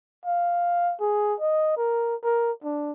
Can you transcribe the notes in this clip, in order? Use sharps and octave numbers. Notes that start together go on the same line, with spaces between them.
F5
G#4
D#5
A#4
A#4
D4